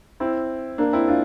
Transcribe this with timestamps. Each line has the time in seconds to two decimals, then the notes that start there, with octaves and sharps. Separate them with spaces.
0.20 C4 E4
0.78 A#3 D4
0.93 C4 E4
1.08 D4 F4